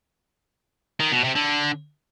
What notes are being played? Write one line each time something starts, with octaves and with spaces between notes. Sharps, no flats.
D#3
B2
C3
D3